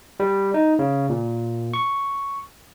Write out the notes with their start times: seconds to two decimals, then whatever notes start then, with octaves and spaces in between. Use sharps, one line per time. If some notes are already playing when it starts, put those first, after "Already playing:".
0.20 G3
0.54 D#4
0.79 C#3
1.09 A#2
1.74 C#6